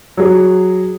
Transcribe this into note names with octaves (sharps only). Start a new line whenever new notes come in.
F#3 G#4